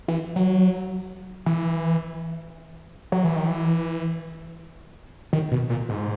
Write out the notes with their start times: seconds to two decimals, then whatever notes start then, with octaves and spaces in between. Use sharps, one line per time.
0.08 E3
0.36 F#3
1.46 E3
3.12 F#3
3.24 E3
3.36 D#3
3.46 E3
5.33 D#3
5.51 B2
5.70 A#2
5.89 G#2